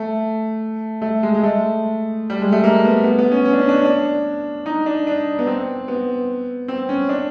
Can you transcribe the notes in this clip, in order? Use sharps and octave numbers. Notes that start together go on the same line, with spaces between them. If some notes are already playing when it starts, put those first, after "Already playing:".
Already playing: A3
A3
G#3
G#3
A3
G3
G#3
A3
A#3
B3
B3
B3
C#4
C#4
D4
C#4
D4
C#4
D4
D#4
D4
D4
B3
C4
B3
C4
C#4
D4